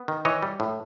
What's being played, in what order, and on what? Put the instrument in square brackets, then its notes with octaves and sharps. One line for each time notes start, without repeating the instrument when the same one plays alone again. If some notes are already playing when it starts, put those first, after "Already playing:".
Already playing: [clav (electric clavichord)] B3
D#3
E3 C#5 D#5
G3
A2